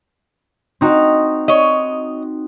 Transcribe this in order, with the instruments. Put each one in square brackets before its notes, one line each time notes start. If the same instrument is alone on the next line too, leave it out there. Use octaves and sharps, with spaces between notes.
[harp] C4 D#4 F#4
[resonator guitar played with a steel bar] C#5 D#5